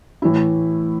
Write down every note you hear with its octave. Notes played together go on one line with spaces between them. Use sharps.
A2 E3 A3 E4